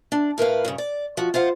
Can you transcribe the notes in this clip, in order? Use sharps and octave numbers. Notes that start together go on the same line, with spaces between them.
D4
A2 A#4 B4 F5
G2 A#2 C#3
D5
F3 F#4
F4 C5 F5 F#5